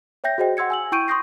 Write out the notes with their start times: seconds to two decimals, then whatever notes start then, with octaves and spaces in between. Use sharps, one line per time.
0.24 C#5 E5 G5 G6 A#6
0.38 F#4 G#4 C5 D#5 G5
0.57 F#5 C6 E6 G#6 C#7
0.70 G#5 E6 F#7
0.92 E4 G5 C#6 G6 D7 D#7
1.08 C6 C#6 D#6 G6 A#6 C7